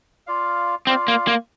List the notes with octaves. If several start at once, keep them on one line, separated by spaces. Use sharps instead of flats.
F4 D5 F5
C4 F4 D5 F5
A#3
A#3